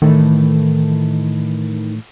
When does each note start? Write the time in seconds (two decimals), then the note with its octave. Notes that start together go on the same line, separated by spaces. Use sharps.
0.02 A2 D#3 E3 A3